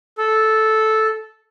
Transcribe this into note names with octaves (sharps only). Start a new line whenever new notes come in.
A4